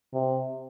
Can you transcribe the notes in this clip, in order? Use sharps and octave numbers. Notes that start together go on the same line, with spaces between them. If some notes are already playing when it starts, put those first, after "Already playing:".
C3